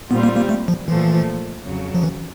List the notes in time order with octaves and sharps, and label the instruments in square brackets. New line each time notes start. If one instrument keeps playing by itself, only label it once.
[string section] A#2 G3 C4 F4 [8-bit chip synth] B3
[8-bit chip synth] A#3
A#3
A3
F3
[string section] A#2 F3 A3 [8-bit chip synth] E3
[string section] F2 C#3 F#3
[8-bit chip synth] F3
E3